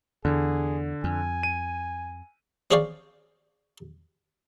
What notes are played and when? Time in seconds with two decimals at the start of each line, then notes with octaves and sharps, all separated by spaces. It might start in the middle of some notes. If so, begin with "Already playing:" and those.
0.25 E2 D3 G#4
1.04 F2 G#5
1.43 D#7
2.71 C4 G#4 C#5 D5 F5 G5